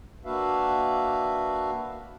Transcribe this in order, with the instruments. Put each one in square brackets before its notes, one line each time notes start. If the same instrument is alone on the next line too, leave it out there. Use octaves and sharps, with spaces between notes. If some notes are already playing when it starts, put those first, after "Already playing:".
[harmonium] A#3 D4 F#4 B4 E5 F5